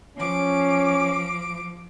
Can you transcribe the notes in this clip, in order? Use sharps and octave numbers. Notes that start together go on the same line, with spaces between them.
F3 C#4 D6